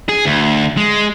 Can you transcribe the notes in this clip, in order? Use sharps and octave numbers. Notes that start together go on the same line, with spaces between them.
G#4
D2
G#3